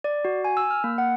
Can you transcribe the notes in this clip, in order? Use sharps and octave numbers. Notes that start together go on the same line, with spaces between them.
D5
F#4
G#5
E6
F6
A#3
F#5